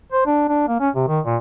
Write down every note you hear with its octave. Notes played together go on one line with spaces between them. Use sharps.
C5
D4
D4
A#3
C#4
C3
D#3
A#2